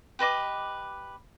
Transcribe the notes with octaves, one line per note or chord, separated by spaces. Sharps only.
G4 B4 D#5 D6